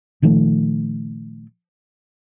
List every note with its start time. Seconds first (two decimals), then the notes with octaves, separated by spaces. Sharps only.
0.22 A#2 D#3 F3 A3